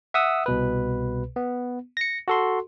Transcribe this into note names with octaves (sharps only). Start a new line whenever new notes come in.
E5 F#5 D#6 E6
C2 B2 B4
B3
A#6 C#7
F#4 A4 C6